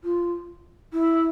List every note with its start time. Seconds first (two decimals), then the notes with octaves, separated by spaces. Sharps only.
0.04 F4
0.93 E4